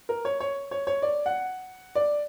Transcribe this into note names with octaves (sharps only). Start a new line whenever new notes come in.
A#4
C#5
C#5
C#5
C#5
D5
F#5
D5